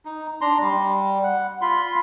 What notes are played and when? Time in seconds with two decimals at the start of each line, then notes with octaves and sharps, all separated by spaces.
0.05 D#4
0.41 D4 A#5 C6
0.61 G3
1.23 F#5
1.62 F4 B5 C6